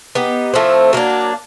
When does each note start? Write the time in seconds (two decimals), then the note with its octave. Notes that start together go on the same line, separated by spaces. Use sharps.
0.15 B3 D#4 G4
0.54 A2 F3 A3 C4
0.93 F#3 A#3 D4